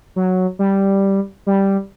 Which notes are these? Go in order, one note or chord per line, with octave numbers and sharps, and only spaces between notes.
F#3
G3
G3